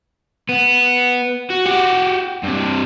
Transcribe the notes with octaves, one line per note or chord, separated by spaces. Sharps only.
B3
F#4
F#4 G4
G2 C3